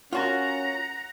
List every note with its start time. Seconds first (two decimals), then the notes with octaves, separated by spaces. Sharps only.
0.13 C#4 F4 F#4 A#4 F#5 A#5